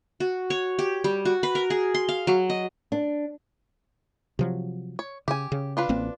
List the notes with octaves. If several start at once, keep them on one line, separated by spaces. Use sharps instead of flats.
F#4
C#5
G4
G3
F#4
B4
A#4
G#4
C6
F5
F#3
D#5
D4
C3 F3 F#3
C#5
C#3 G4 G#5
C#3
D4 F4 B4
A1 A#3 C4